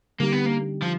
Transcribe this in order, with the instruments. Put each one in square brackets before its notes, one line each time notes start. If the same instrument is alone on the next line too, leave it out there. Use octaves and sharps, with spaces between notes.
[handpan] D3 G3 C4 D#4 G4 [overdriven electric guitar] A#3
[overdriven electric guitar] B3
A#3
F3